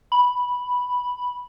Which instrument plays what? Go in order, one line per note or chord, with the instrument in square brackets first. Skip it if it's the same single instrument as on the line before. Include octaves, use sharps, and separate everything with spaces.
[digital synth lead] B5